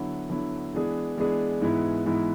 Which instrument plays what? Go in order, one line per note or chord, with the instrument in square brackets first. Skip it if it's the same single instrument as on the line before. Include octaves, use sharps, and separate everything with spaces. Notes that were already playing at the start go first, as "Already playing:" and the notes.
Already playing: [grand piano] D3 F#3 B3 E4
D3 F#3 B3 E4
E3 G#3 B3 D4 G#4
E3 G#3 B3 D4 G#4
G#2 E3 G#3 B3 E4
G#2 E3 G#3 B3 E4